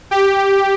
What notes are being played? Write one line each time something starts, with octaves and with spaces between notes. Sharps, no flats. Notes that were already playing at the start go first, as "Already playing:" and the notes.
G4